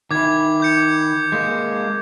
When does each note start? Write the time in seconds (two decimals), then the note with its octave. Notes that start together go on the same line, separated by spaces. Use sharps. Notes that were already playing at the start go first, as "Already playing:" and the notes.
0.11 D#3 E4 D6 G#6
0.60 D6 G6 C#7
1.32 G#3 A#3